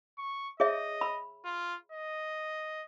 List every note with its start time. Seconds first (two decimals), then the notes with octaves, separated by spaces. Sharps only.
0.18 C#6
0.60 G#4 C#5 D#5 E5
1.01 B5
1.45 F4
1.92 D#5